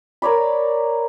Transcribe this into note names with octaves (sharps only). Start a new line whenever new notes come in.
A#4 C#5 D5 B5